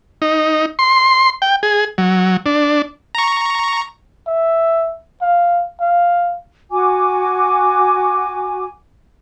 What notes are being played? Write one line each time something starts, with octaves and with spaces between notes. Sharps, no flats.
D#4
C6
G5
G#4
F#3
D4
A#5 C#6
E5
F5
F5
F#4 G#5 D6